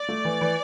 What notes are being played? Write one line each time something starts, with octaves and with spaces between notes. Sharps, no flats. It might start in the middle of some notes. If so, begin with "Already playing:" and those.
Already playing: D5
A3
E3
E3